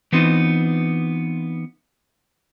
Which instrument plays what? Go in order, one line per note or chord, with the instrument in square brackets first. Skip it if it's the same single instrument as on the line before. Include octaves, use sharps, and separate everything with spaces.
[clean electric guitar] E3 B3 C4 D#4 F4